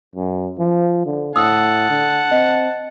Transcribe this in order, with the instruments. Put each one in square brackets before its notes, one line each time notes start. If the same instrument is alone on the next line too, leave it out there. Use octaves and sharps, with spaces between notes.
[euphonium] F#2
F3
D3
[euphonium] A2 [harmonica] F#5 A5 [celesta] D#6 E6
[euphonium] D3
[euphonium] C4 [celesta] D#5